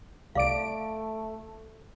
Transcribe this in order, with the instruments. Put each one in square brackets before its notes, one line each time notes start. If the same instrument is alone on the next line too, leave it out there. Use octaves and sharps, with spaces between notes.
[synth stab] C2 D5 D7 [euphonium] A3 [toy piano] F5